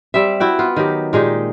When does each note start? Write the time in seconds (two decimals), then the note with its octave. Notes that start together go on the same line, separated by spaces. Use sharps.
0.14 G3 C4 E5
0.40 E4 F#4 G5
0.59 B3 F4
0.76 D#3 F#3 G4
1.13 A#2 G#3 D#4 G4